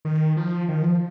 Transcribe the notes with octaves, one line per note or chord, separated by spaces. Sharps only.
D#3
F3
D#3
F3